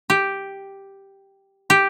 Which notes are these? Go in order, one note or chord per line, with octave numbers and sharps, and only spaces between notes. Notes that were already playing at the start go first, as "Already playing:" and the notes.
G4
G4